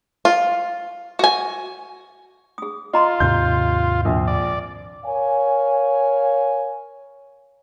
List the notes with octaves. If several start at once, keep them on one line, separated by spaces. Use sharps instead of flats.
F4
F#4 G#5
G#4 D#6
F4 D#5 A#5 C6
D#2 G#2 C3 G6
A#1
D5
A#4 C#5 F5 G#5